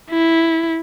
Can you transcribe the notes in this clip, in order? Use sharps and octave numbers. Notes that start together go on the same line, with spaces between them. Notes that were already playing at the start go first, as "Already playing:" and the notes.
E4